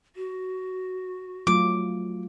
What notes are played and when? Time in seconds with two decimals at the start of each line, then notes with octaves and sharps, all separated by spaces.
0.16 F#4
1.47 F#3 A3 F4 D6